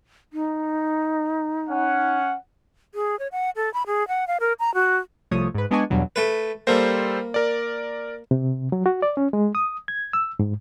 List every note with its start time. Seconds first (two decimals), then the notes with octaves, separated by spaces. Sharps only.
0.33 D#4
1.69 C#4 F#5
2.95 G#4
3.19 C#5
3.32 F#5
3.56 A4
3.74 B5
3.87 G#4
4.08 F#5
4.28 F5
4.40 A#4
4.60 A#5
4.74 F#4
5.31 C2 F3 A3 C#5 D#6
5.55 G#2 B4
5.71 G#3 B3 D4 D#5 G#5 C#6
5.90 E2 G2 B2 F#3
6.16 A3 B4
6.67 G3 A#3 A4 C5
7.34 A#4 D5
8.31 C3
8.72 F#3
8.86 F#4
9.02 D5
9.17 C#4
9.33 G#3
9.55 D#6
9.88 G#6
10.13 E6
10.39 G#2